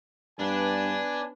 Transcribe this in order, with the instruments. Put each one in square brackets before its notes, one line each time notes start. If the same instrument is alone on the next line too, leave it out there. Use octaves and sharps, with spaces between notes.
[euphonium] G2 [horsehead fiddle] B3 B4 [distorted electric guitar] D4 [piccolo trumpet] G#5